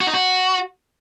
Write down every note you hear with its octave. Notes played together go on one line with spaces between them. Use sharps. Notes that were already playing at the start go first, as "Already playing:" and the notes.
F#4
D#4
F#4